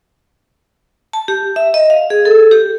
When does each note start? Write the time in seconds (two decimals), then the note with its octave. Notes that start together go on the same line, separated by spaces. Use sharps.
1.13 A5
1.28 G4
1.56 E5
1.74 D#5
1.90 F5
2.10 G#4
2.25 A4
2.51 G4